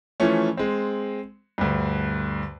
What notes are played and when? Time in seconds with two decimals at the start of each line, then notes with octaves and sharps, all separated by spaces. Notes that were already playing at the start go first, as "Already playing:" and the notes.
0.20 E3 F3 A3 C#4
0.57 G#3 C4
1.58 D2 G2